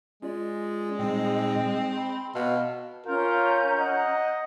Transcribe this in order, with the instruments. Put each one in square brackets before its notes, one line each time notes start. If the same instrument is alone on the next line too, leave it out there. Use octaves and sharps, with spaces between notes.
[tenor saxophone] G#3 [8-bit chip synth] C#4 F4 D5
[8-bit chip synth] A#2 G3 D#4 [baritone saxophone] C4
[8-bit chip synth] B5 C6
[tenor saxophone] B2 [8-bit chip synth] F5 A5 F6
[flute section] C#4 A#5 G6 [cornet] F4 [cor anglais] A#4
[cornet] D#5 [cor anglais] F#5